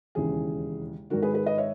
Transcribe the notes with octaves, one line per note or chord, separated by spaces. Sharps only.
E1 D#2 C#3 E3 G#4
G#1 G#2 D#3 F#4 A#4
G#4 B4
G#4 B4
B4 D#5
C#5 E5